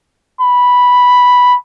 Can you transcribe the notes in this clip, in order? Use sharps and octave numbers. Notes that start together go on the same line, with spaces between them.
B5